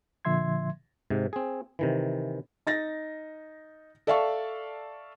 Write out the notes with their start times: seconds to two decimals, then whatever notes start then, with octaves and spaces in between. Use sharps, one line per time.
0.25 A#2 D3 F3 E5 C6 G#6
1.10 G#2 C3
1.33 C4 G#4
1.79 C3 D#3 E3
2.67 D#4 A6 A#6
4.07 A4 D5 E5 F5 A5 C#6